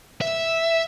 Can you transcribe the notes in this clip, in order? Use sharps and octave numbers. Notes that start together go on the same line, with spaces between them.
E5